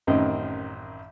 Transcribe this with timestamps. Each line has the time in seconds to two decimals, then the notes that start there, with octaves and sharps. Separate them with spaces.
0.07 A1 F#2 D#3 C4 D#5